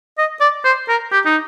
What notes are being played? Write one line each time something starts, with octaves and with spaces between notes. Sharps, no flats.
D#5
D5
C5
A#4
G4
D#4